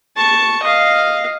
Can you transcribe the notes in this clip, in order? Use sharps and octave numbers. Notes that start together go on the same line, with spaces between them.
A5 C#6
D#5 F5